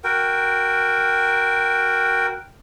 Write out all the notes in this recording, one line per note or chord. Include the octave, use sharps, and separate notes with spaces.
F#4 A#4 G5